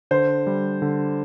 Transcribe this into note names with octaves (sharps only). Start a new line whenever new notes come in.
D3 C5
G3
D3